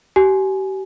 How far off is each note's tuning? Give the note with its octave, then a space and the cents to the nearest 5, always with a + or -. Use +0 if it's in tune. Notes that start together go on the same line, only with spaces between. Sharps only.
G4 -35 G#5 +15